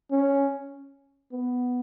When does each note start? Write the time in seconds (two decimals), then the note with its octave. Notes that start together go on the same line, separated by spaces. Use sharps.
0.11 C#4
1.32 B3